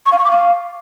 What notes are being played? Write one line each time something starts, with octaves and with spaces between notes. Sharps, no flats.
C#6
F5
C#6
D6
F5